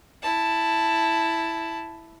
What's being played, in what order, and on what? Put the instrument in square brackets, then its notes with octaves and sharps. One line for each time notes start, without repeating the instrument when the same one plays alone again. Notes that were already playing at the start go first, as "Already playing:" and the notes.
[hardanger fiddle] E4 A5